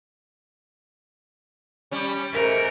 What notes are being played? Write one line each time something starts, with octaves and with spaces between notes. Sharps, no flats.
G3 C#4
G#2 A3 A#4